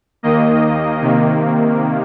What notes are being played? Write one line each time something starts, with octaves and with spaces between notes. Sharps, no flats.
D#2 D#3 A#3 D#5
C3 D#3 A#3